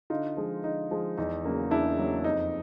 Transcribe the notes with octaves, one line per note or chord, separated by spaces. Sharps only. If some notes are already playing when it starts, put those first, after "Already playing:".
D3 D#4 F4
F3 G#3
D3 D#4
F3 G#3
E2 D#4
C#3 F#3 A#3
E2 D4 E4
C#3 F#3 A#3
F2 D#4